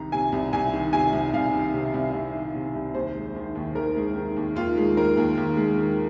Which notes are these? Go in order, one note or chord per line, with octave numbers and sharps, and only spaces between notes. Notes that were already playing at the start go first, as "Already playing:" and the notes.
Already playing: C2 D#3 A#5
C3 G#5
C2
C2 G#5
D#3
C3 G#5
C2
C2 F5
D#3
C3
C2
C2
D#3
C3
C2
D#2 C5
G#3
D#3
D#2
D#2 A#4
G#3
D#3
D#2
D#2 F4
G#3
D#3 A#4
D#2
D#2
G#3
D#3